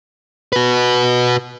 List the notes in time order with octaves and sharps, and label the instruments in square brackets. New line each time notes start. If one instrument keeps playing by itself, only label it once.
[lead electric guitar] F#4 B4